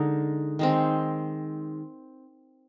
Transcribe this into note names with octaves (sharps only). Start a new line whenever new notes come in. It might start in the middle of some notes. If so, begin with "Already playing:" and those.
Already playing: D3 G#3 D#4 A#4
D#3 G#3 C4